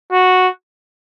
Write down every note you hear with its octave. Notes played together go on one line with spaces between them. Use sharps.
F#4